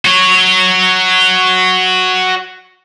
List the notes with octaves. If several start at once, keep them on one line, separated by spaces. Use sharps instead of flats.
F#4 C#5